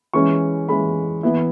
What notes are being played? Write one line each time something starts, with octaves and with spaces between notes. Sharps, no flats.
E3 G#3 C#4 C#6
E3 G#3 C#4 B5
E3 B3 E4